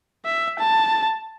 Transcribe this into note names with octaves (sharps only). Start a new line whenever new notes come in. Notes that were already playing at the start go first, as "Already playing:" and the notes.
E5
A5